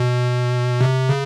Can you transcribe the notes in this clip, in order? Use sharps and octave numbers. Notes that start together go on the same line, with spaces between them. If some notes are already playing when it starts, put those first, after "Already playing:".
Already playing: B2
C3
C#3